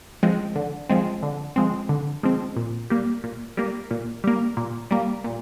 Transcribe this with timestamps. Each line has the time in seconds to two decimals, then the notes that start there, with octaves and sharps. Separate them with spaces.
0.23 F3 G#3 C4
0.56 D3
0.89 F3 G#3 C4
1.23 D3
1.56 F3 G#3 C4
1.89 D3
2.23 F3 G#3 C4
2.56 A#2
2.90 G3 A#3
3.24 A#2
3.57 G3 A#3
3.91 A#2
4.24 G3 A#3
4.57 A#2
4.91 G3 A#3
5.24 A#2